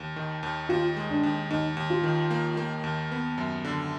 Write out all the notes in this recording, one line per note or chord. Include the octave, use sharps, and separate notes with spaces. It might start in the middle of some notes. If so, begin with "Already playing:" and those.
Already playing: D#2
D#3
D#2
D#2 F4
G#3
D4
D#2
D#2 D#4
D#2
F4
D#3
A#3
A#3
D#2
B3
F#2
D3